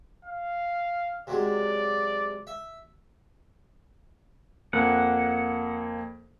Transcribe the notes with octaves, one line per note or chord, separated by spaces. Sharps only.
F5
C3 F#3 G#3 D5
E5
F2 A#3 F#5